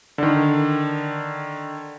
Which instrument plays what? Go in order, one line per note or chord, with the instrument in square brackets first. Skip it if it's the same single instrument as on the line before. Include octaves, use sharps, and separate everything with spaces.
[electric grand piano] D3 D#3